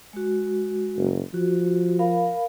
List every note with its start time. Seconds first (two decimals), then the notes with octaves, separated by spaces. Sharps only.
0.13 G#3 F#4
0.97 F#1
1.34 F3 F#4
1.99 A#4 F5 B5